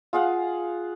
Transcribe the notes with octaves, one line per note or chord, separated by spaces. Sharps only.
F4 G#4 F5 F#5